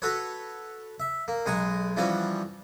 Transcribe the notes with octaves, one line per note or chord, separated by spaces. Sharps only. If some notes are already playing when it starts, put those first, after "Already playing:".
F#4 A4 B4 C#5
E5
A#3
B1 G#3 F#5 G#5 A#5
E3 F3 G3 C#4 F#4 D5